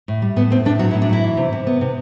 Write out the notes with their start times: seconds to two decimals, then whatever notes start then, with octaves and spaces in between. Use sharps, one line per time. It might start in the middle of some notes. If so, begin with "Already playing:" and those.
0.08 A2
0.22 G3
0.36 A2 B3
0.51 B3 C4
0.65 A2 D4
0.79 F#3 F#4
0.91 E4
0.94 A2
1.02 D4
1.09 F#3 E4
1.24 E3
1.37 C3
1.53 C3
1.67 B3
1.81 C3